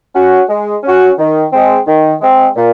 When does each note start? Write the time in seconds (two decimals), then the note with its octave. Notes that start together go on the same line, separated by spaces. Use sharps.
0.15 C#4 F#4
0.49 G#3
0.84 C#4 F#4
1.18 D#3
1.52 G#3 C4
1.87 D#3
2.21 G#3 C4
2.56 A#2